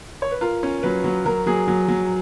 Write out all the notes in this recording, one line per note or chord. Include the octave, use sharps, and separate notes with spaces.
C#5
B4
F4 A#4
C#4
F#3 B4
F#3
F#3 A#4
F#3 G#4
F#3
F#3